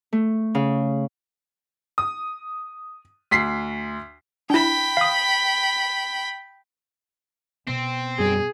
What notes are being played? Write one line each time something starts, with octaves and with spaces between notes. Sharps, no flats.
A3
C#3
D#6
D2 B6 C7
D4 E4 G5 B5
F5 D#6
B2 C4
F#2 G3 G#4